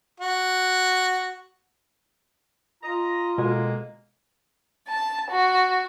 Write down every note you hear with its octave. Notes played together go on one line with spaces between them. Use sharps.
F#4
F4 D#5 A#5
B2 D3 G#3 A#3
A5
F#4